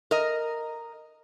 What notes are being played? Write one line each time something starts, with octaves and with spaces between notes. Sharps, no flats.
A#4 D#5